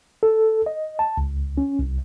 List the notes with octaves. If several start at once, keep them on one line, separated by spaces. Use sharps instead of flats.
A4
D#5
A5
C#2
C#4
C2